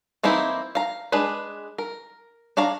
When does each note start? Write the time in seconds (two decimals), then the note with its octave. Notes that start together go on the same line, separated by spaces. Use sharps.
0.23 E3 A#3 C4 D#4 E4
0.75 F5 A#5
1.12 G#3 D4 G#4 B4
1.78 A#4
2.57 D4 C#5 F5 A#5